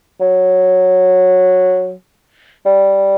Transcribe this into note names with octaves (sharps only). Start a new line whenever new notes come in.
F#3
G3